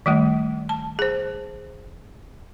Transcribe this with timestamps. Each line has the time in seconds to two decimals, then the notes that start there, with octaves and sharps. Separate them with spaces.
0.06 D#3 G3 A3
0.69 A5
0.99 G#4 C5